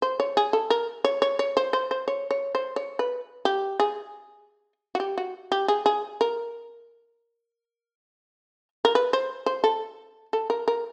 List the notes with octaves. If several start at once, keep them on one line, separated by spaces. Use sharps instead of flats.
C5
C#5
G#4
A4
A#4
C#5
C#5
C#5
C5
C5
C5
C#5
C#5
C5
C#5
B4
G4
G#4
F#4
G4
F#4
G4
G#4
G#4
A#4
A#4
B4
C5
C5
A4
A4
A#4
A#4